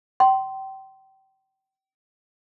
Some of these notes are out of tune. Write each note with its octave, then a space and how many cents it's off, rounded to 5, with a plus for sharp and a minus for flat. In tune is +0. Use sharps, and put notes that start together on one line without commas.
G5 -30 C6 +0